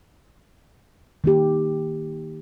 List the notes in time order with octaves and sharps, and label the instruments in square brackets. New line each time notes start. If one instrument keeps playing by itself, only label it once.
[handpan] D#3 A#3 G4